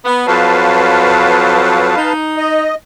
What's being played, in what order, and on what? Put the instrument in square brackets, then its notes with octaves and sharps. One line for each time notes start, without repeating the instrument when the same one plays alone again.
[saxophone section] B3
[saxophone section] F2 F#3 [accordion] B4 F5 A5
[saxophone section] D#4
[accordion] D#5